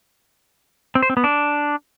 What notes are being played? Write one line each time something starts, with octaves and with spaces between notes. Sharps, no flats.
C4
C5
C4
B3
D4